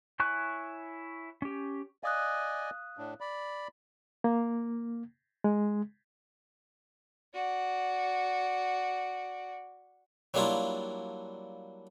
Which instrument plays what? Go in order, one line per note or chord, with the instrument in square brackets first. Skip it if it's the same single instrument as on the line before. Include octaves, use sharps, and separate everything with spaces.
[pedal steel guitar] E4 C#5 G#5 C#6 F#6
C#4 G4
[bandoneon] D5 D#5 G#5 [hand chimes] F5 D#6 F#6
[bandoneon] A2 D4
D5 B5
[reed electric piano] A#3
G#3
[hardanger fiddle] F#4 D5
[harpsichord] F#3 G3 A#3 D4 E4 F4